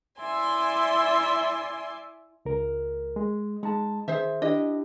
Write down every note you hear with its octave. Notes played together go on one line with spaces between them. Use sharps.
E4 D5 E5 G#5 C6
C#2 A#4
G#3
G#3 D#4 A5
D#3 G#4 C5 E5
D4 E4 G4 D#5